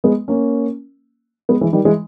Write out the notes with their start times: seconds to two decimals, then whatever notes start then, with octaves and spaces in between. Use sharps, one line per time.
0.04 G#3 B3
0.28 A#3 C#4
1.49 G#3 B3
1.61 E3 G#3
1.73 D#3 G3
1.85 E3 G#3